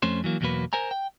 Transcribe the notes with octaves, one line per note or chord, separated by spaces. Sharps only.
F2 A3 C#4 C5
E3 F#3 A#3
E2 B2 F#3 A#3 B4
A#4 C5 G#5 A#5
G5